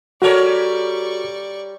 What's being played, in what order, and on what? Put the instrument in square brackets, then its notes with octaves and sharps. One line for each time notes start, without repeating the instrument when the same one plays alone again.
[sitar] G3 A#4 C#5 [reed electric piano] F#4 A4 [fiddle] D5 C#6